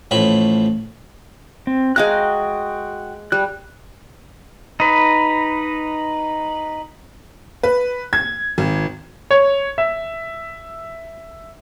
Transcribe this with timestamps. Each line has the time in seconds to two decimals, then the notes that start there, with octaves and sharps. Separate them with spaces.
0.11 A1 A2 F3 B5
1.67 C4
1.96 G#3 F#4 F5 G5 A#5 F#6
3.32 G3 F#6
4.80 D#4 B4
7.63 B4
8.13 G#6
8.58 G#1
9.31 C#5
9.78 E5